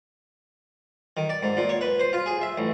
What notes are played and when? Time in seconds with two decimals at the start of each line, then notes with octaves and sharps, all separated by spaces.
1.17 D#3
1.29 D5
1.43 G#2
1.57 A#2
1.69 C#5
1.81 B4
2.00 C5
2.13 F4
2.26 G#4
2.42 E5
2.58 A1